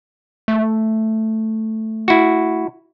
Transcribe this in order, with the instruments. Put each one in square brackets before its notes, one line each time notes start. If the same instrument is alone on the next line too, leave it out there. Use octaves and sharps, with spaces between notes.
[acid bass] A3
[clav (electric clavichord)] E4 F#4